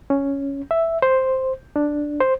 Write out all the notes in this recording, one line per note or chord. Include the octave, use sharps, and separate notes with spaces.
C#4
E5
C5
D4
C5